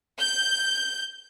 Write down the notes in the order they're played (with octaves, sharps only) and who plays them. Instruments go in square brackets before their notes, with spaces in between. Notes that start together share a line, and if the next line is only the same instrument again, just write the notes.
[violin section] G6